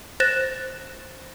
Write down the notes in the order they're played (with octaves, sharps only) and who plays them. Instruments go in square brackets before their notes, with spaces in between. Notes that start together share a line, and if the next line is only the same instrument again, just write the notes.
[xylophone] C5 F#6 A6 A#6 E7